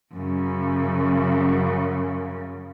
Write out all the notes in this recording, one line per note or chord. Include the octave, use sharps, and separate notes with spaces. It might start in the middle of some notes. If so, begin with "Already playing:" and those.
F#2 C#3